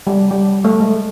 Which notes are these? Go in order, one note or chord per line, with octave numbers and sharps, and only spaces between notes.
G3
G3
A3
G#3